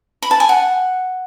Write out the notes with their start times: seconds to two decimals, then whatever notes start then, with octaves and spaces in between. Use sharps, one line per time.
0.22 B5
0.31 A5
0.40 G#5
0.49 F#5